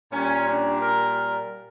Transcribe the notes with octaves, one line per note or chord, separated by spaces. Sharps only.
A#2 G3 C#4
D4
A#4